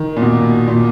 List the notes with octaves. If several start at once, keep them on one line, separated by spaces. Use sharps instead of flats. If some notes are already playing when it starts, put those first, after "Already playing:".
Already playing: D#3
A#2
B2
A#2